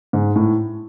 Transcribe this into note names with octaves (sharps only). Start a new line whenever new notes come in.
G#2
A2